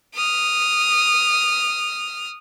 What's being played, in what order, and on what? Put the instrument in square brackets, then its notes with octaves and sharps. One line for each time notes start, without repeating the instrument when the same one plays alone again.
[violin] D#6 F6